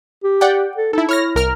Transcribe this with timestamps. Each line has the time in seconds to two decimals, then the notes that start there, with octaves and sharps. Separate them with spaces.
0.24 G4
0.41 D5 F#5 G5
0.77 A4
0.93 D#4 E4 A4
1.09 E4 C#5 F6 A#6
1.35 C2 A#4 F6